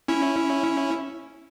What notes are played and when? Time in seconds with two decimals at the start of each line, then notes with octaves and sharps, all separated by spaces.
0.08 C#4 E4